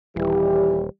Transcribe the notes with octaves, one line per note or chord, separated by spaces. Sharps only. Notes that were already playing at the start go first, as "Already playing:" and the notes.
D#1 E3 G3 G4